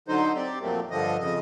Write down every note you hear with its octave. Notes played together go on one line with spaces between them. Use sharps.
D3 F#3 D#4 C5
C4 G4 D5
F2 A#2 F#3 A3 A#3 C4
G2 D3 F3 D#5
F2 C#3 D#5